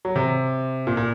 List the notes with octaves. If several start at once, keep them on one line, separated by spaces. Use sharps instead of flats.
F#3
C3
A#2
A#2